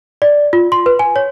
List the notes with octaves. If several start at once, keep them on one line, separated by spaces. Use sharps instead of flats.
D5
F4
C6
B4
G#5
C#5